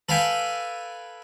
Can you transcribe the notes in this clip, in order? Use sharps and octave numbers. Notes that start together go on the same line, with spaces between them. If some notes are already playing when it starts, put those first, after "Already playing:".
A4 B4 F5 G5 G#5